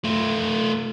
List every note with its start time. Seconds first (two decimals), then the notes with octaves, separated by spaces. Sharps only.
0.04 A3 F4